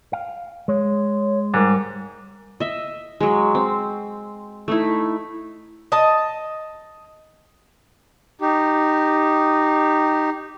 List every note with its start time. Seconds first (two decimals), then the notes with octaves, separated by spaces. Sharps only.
0.13 F5
0.68 G#3 C#5
1.54 G#2 G3 A#4 D6 A#6
2.60 D#5 E5
3.21 F#3 G#3
3.55 C4
4.68 A3 D#4 E4
5.92 D#5 A5
8.41 D#4 G4